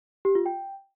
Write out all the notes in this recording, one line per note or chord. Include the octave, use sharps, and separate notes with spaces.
G4
F4
G5